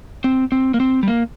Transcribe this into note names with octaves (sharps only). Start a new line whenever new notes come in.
C4
C4
A#3
C4
G3
A#3